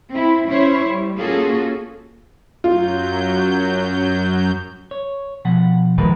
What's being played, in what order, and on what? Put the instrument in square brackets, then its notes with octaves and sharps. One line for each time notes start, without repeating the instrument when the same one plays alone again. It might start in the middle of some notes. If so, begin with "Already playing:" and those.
[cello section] C4 E4
C#4 E4 C5 C#5
G3
A#3 C#4 F4 F#4 G#4 A4
[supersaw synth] F#2 F#3 G6 [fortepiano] F4
[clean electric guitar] C#5
B2 F3 F#5
[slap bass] D#3 F3 G#3 [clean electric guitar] A#4 B4